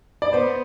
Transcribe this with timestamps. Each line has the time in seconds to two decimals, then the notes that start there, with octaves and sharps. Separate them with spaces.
0.22 D5
0.33 B3 C5